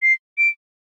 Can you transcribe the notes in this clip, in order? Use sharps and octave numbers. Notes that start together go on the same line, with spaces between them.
C7
D7